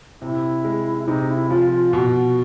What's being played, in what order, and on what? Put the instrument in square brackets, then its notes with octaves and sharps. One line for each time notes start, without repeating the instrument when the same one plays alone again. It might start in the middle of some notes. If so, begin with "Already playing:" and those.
[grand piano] C3 [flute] E4
[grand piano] G#3
[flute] E4
[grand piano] C3 [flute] D#4
[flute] E4
[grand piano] F3 [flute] F4
[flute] F4
[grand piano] B2 [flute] F#4